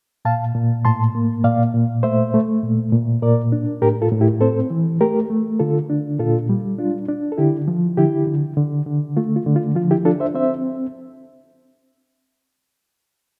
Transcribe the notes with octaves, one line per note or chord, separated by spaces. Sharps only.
A#2 F5 A5
A#2
A2 A5 C6
A#3
A#2 D5 F5
A#2
A3 C5 E5
A3
A#2
A#2
A#2 A#4 D5
D4
A2 G4 A#4
F4 A4
A2
E4 G4
C4 A4 C5
E3
A3 G4 A#4
A3
D3 F4 A4
D4
A#2 F4 A4
G3
D4 F4
D4
A4
D3 E4 G4
F3
D3 E4 G4
D3
D3
D3
A3 F4
F4
D3
F4
F3 F4
E4 G4
D4 F4 A4
C5 E5
C4 C5 E5